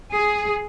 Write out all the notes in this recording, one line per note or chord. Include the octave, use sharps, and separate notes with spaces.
G#4